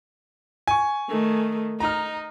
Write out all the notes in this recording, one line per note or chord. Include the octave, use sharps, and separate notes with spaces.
G#5 C#6
D#3 A3
D#4 A#5 F6